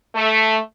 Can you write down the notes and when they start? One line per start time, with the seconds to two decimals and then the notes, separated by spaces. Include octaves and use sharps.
0.15 A3